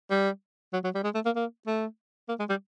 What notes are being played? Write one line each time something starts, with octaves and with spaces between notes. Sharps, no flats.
G3
F#3
F#3
G3
G#3
A3
A#3
A#3
A3
A#3
G#3
G3